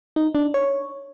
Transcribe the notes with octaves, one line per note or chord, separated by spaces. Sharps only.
D#4
D4
C#5